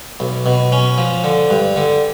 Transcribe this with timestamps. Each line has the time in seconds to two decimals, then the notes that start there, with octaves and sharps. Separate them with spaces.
0.20 B1
0.46 B2
0.72 C#4
0.98 F3
1.24 D3
1.50 G2
1.76 D3